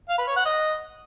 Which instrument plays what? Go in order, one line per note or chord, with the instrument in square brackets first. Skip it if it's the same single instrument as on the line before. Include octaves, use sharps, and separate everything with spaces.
[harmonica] F5
B4
C#5
F#5
D#5